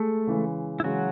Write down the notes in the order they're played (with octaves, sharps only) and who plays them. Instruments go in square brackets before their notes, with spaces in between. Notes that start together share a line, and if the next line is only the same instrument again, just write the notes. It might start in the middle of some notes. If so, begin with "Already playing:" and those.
Already playing: [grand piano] G#3 [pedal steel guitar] A3 A4
[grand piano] C#3 E3 G#3
[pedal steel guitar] E4
[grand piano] C#3 E3 G#3 [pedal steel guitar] F#3 F#4